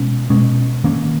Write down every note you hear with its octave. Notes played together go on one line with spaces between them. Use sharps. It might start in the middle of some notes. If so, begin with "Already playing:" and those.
Already playing: B2 G#3 C#4
B2 G#3 C#4
D#3 A#3 C#4